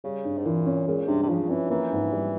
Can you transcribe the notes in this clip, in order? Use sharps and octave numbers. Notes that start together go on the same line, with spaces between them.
C#3 G3
G2
G#2
A#2 E3
C#4
A#2 G#3
G2 C3
C3
C#3 F3
E3 C#4
E3 A#3
G#2
G3